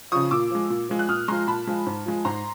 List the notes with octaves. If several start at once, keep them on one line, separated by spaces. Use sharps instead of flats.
C#3 F3 C#6 D#6
A#2 D6 E6
F3 G#3
A#2
F3 G#3
F#6
A#2 D#6 F6
F3 G#3 A#5 C6
A#2 A5 B5
F3 G#3
G#2
F3 G#3
G#2 A#5 C6